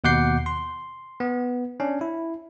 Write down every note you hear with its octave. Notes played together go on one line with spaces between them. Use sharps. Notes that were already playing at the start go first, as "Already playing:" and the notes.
D#2 B2 F#5 D6 G6 C7
C6
B3
C#4 D4
E4